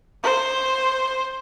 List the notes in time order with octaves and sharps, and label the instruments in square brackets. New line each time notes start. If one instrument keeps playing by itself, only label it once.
[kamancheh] C5